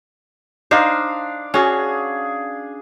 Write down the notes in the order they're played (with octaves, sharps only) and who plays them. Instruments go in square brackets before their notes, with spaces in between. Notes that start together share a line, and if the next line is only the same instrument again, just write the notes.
[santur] D4 F5 [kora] D#4 C5
[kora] C#4 F#4 [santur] G#4